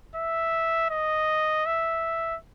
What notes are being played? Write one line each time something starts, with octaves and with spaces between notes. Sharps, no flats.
E5
D#5
E5